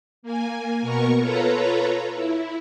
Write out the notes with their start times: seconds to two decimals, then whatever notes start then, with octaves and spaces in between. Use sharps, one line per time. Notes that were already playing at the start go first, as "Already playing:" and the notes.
0.23 A#3 G#5
0.82 B2 B3 A#4 C#6
1.20 F4 A4 B4 C#5 A#5
2.14 E4